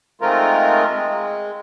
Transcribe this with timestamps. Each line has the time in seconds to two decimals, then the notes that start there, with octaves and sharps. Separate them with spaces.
0.21 D#3 G#3 A3 C4 F4 A#4
0.93 G#3